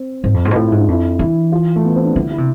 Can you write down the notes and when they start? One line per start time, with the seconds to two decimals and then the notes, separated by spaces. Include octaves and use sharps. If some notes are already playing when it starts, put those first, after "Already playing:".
Already playing: C4
0.23 G#2 C4
0.34 F2
0.45 G#2
0.51 B2
0.56 A2 F4
0.67 G#2 E4
0.79 D4
0.88 F2 E4
1.19 E3 E4
1.52 F4
1.76 A3
1.85 B3
1.95 C4
2.05 D4
2.15 D3 E4
2.31 E4
2.38 C3